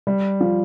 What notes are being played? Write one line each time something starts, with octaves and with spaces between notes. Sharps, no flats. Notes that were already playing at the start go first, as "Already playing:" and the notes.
G3
F3